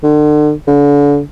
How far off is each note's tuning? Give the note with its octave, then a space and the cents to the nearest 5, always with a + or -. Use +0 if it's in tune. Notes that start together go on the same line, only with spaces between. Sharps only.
D3 +35
D3 -35